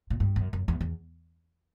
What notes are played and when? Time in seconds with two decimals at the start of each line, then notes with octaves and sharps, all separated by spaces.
0.10 A#2
0.20 G2
0.36 F#2
0.53 F#2
0.68 E2
0.81 E2